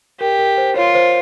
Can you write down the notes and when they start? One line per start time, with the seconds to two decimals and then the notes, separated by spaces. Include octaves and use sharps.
0.20 G4 A#4
0.39 A#4
0.57 C5
0.76 F4 C#5
0.95 C5